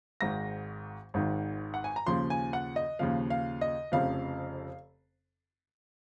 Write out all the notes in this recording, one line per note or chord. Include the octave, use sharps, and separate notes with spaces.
G#1 G#2 D#3 A#6
G#1 G#2 D#3
F#5
G#5
A#5
D#2 C#3 F3 C6
G#5
F#5
D#5
D#2 C#3 F3 F5
F5
D#5
F1 F2 C#3 F3 F5